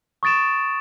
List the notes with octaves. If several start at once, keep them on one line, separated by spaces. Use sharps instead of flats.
C#6 D#6 A6 D7 E7